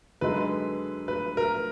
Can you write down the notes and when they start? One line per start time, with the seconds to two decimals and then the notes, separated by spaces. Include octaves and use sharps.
0.21 F#2 D3 G#3 D#4 B4
1.08 B4
1.37 A#4